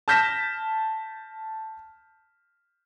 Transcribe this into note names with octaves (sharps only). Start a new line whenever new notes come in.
A5 F6 G6 A#6 B6 E7